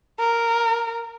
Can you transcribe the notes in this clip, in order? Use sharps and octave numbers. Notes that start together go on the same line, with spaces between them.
A#4